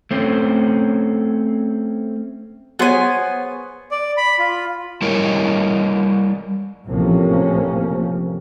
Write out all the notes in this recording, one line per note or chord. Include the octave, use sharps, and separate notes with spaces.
A3 C4 C#4
B3 G#4 C5 C#5 G#5
D5
B5
F4
G3 E4 A#4 C#5 D#5
A1 C3 F3 A#3 C#4